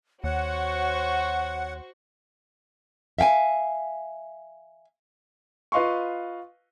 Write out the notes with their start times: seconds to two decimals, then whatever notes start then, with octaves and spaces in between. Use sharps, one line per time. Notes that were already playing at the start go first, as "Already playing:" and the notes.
0.24 D#2 F#4 C5 C#5 F#5 C#6
3.19 E5 F5 G5 G#5
5.72 F4 B4 D#5 F5 C6 C#6